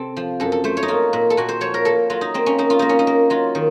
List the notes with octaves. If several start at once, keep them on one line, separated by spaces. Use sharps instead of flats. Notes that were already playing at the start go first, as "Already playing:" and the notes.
Already playing: C3 C4 A4
F3
F#2 A4
A4
A3 C5
C#5
D#4
A#3 F4
A#2
A4
A#2 F#4
C5
F3 C#5
A#4
A#3 A4
F#3 F4
D#4
A#3 C4
C#4
A#3 D#4
F4
A#3 D#4
C#4
D#4
A#3
F#3 F4
D#3